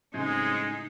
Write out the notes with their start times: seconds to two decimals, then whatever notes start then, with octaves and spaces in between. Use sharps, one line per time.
0.14 A2 C#3 F#3 G#3 C4 D#4 G#4